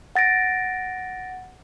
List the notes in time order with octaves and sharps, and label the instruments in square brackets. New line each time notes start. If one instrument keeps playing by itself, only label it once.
[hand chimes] F#5 A6 A#6 D7